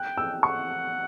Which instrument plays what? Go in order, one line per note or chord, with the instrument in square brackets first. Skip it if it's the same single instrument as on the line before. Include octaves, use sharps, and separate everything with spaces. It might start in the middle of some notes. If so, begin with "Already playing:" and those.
Already playing: [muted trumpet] G5 [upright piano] F#6
[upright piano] E6
[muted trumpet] F#5 [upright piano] C#6